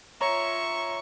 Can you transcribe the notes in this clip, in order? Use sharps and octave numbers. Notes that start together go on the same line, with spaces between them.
F4 C#5 E5 A#5 C#6